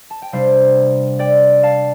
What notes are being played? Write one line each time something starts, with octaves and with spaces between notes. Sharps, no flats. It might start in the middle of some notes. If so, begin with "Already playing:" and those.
A5
G5
C3 G3 D4 C5 F5
D5 G5
F5 A5